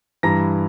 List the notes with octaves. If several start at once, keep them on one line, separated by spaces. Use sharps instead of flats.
G2 E3 A#5 A#6